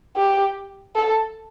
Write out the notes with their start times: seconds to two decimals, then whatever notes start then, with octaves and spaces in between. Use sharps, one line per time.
0.16 G4
0.95 A4